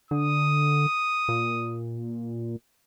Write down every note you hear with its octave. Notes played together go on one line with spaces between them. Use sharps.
D3 D#6
A#2